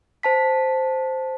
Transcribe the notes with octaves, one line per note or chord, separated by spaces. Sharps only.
C5 A5 B6